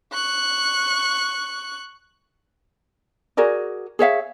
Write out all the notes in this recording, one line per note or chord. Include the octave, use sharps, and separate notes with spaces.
C#6 F#6
F#4 G#4 A#4 D5
G#4 C#5 E5 F5